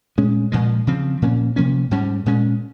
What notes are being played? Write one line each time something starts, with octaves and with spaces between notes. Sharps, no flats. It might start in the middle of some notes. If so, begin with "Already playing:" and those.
A#2 G#3 C#4
A#2 F3 G#3
C#3 F3 C4
A#2 F3 A#3 C#4
C3 F3 A#3 C#4
G#2 G3 C#4
A#2 G#3 C#4